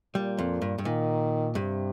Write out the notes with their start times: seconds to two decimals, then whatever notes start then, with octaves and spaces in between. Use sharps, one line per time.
0.15 A#2 G3
0.38 F2
0.62 G2
0.78 G2
0.85 A#2 D#3
1.55 G2 C3